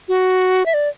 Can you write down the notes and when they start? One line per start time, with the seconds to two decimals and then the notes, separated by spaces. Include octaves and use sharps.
0.08 F#4
0.66 E5
0.74 D5